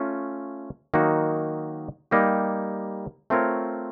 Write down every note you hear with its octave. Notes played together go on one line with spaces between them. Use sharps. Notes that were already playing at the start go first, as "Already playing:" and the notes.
Already playing: A3 C#4 F4
D#3 F#3 A#3 D#4 F#4
G3 A#3 D#4 G4
A3 C4 F4 A#4 C#5